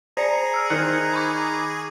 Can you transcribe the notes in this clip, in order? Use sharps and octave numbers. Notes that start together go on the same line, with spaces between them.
G#4 C5 D5 A#5 C#7
E6 F6
D#3 C5 A#5 F#6 C#7
B5 C#6 D6